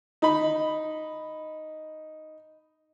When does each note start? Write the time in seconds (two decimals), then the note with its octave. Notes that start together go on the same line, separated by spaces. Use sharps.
0.22 D#4 B5